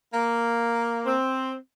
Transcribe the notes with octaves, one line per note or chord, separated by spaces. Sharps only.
A#3
C4